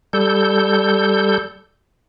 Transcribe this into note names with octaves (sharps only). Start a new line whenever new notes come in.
G3 A4 G6